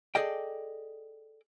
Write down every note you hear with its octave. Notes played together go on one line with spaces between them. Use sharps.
G#4 A4 D5 D#5 G5